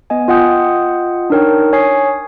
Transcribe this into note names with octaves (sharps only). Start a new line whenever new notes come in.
B3 D#5 G#5
F4 D#5 F#5 G5 D#6 G6
D4 D#4 A#4 C#5 G5
C#5 G#5 D#6 C7